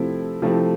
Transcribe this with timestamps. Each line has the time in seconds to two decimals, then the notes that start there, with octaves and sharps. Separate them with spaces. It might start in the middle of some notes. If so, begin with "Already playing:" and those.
Already playing: C3 F3 A3 C4 E4
0.42 C3 F3 A3 C4 E4